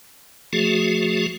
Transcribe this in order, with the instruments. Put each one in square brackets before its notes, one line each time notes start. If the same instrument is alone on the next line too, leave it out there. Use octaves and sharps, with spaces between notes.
[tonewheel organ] F3 A3 F#4 G#4